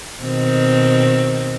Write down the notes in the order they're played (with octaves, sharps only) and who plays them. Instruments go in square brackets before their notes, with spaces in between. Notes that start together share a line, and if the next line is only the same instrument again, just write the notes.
[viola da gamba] B2 D#3 C4